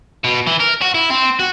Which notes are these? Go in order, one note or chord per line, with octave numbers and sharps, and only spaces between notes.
B2
E3
A#4
F#4
E4
C4
F#4